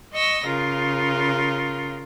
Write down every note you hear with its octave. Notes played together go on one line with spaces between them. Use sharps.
D#5 C#6 E6 A#6
C#3 F4 A#4